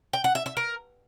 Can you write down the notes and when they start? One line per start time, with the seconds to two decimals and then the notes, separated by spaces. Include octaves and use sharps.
0.13 G5
0.24 F#5
0.35 E5
0.46 E5
0.57 A#4